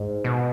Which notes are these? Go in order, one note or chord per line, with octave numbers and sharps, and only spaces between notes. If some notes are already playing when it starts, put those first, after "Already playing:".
Already playing: G#2
B2